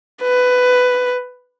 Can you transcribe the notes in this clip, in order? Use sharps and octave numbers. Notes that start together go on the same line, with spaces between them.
B4